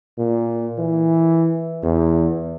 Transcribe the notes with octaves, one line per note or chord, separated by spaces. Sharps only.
A#2
E3
E2